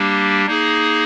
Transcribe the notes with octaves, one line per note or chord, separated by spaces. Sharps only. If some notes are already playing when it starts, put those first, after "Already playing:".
Already playing: G3 A#3 D4 G4
A#3 D#4 G#4